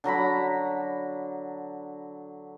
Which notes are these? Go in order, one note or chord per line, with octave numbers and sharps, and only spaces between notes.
D3 F#3 A#5 B5